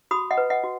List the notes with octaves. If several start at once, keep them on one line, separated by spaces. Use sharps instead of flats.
F#4 B5 D#6
D#5 F#5
B4
D#5 F#5
F#4